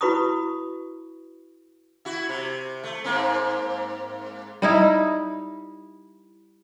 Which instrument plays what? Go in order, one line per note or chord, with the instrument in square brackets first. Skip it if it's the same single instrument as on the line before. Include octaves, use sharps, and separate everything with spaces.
[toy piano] E4 F#4 B4 B5 C#6 D#6
[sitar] E4 F#4
C3
A3
G#2 A#3 C4
[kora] G3 D#4 E4